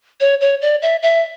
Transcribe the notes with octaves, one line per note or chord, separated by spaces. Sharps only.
C#5
C#5
D5
E5
E5